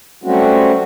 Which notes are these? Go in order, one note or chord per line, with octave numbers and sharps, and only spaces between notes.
F#3 G3 A3 C4 C#4 F#4